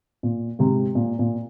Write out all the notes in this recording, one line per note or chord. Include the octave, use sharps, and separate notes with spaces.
A#2
G#2 C3
A#2
A#2